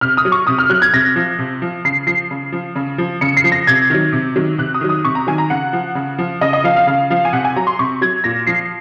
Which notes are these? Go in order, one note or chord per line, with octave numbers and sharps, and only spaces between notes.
C3 F6
D#6
F#3
C#6
C3 D#6
F6
F#3 F#6
G#6
C3 A#6
F3
C3
F3
C#3 C7
F3 C7
C#3
F3
C#3
F3
C#3 C#7
C7
F3
A#6
C3 G#6
D#3 F#3
C3
D#3 F#3
C3 F#6
D#6
D#3 F#3
D#6
C3 C#6
A#5
D#3 F#3 G#5
A#5
C#3 F#5
F3
C#3
F3
C#3 D#5
D#5
F3 F5
F5
C#3 F5
F3 F5
G#5
C3 F#5
G#5
F#3 A#5
C6
C3 C#6
F#3 G#6
A#2 A#6
F3 C7